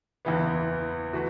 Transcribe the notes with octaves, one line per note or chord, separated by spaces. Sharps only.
F#1 E2 E3 B3
E3 A3 F#4 B4